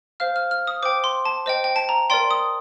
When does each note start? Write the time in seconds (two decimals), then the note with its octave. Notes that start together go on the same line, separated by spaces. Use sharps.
0.20 C5 F5 F6
0.36 F6
0.51 F6
0.67 D#6
0.83 C5 G5 D6
1.04 C6
1.25 A5
1.46 C5 D#5 G5
1.64 G5
1.76 A5
1.89 A#5
2.10 A#4 D5 G5 C6
2.31 D#6